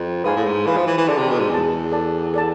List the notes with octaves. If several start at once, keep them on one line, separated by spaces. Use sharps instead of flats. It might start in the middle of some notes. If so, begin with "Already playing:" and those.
Already playing: F2
G#2 B4 F5 G#5
A2
G#2
E3 B4 F5 G#5
F3
E3
E3
D3 G#4 D5 A5
C3
B2
G#2
E2 G#4 D5 A5
A4 D5 A5
A4 D5 A5